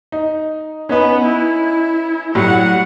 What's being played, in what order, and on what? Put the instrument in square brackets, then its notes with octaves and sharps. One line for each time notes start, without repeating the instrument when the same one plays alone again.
[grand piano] D#4
[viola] B3 [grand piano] C#4 D#4 B4
[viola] E4
[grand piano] A2 F#3 G3 [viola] F#5